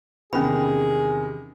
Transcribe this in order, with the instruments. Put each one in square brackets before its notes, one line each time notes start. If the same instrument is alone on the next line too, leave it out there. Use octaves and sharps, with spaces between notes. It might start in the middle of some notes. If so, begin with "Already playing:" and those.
[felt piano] E2 C3 D#3 [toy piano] C#4 B5 [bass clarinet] G#4